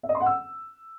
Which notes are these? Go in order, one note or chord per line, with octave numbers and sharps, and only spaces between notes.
E5
D#5
C6
F#5
E6